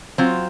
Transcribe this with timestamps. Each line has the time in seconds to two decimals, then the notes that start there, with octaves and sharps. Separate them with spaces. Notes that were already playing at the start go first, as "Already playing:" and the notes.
0.18 F#3 C4 F4